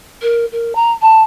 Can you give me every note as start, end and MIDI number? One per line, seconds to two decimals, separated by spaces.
0.22 0.45 70
0.52 0.73 70
0.75 0.91 82
1.02 1.23 81